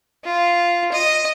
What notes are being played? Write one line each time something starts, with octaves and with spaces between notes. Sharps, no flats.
F4
D#5